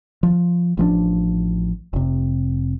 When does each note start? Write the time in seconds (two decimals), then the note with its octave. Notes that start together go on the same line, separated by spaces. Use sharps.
0.23 F3
0.77 A1 F3 F#3 D4
1.93 F1 C3